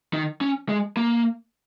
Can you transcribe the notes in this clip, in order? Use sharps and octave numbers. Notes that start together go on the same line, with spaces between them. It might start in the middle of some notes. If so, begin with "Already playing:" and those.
D#3
C#4
G#3
A#3